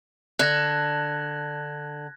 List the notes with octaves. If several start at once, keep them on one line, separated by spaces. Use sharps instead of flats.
D3 D4 F#6 G#6 A#6